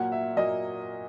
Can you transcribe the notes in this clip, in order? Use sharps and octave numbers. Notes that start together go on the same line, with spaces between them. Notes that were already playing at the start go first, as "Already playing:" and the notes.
Already playing: A#2 F#3 A#3 F#5
E5
A#2 F#3 A#3 D#5